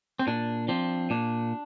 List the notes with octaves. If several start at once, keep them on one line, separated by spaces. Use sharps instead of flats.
C4
A#2 D4
F3 C4 D4
A#2 D4